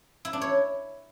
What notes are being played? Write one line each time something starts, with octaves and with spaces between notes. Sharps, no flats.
E4
D4
C#5